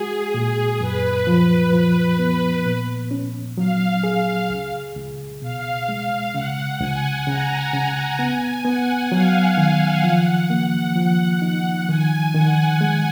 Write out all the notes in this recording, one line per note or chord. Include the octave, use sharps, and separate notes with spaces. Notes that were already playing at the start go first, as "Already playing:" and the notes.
Already playing: G#3 F#4 G#4
A#2
F#2 B4
F3
F3
B3
A#2
C#4
F#3 F5
G#4
C#2
C#2
B2 F5
G#3
C#3 F#5
C#2 G#5
C#3 A#5
C#3
B3 G#5
B3 F#5
F#3 F5
D#3
F3 F#5
A#3
F3
D#4
D#3 G#5
D#3 F#5
G#3 F#5